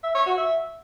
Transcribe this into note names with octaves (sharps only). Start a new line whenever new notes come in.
E5
C#5
F#4
E5